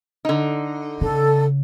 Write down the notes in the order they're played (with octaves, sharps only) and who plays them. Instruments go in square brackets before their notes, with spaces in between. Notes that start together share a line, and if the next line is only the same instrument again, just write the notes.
[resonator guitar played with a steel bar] D3 D#4
[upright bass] C#3 [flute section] A4